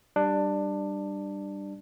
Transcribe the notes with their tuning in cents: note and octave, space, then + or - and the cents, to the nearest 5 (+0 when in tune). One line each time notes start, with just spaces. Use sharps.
G3 +0 D4 +15